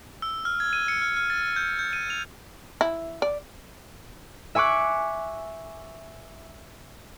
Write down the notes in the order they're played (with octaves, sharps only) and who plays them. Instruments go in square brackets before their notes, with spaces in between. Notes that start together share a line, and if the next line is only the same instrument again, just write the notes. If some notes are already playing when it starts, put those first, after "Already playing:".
[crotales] E6
F6
G#6
D#7
C#7
F6
F6
A6
G6
G6
D#7
F7
[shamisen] E4
D5
[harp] E5 G#5 C#6 D6 F#6